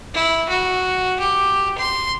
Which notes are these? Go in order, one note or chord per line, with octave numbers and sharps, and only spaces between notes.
E4
F#4
G4
C6